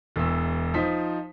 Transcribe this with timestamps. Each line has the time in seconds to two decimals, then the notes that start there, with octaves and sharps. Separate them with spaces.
0.16 E1 E2 E6
0.74 F3 D#4 C5 B6